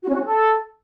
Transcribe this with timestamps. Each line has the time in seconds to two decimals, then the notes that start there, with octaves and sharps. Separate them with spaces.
0.03 F#4
0.09 C#4
0.14 F#4
0.20 C#4
0.25 A4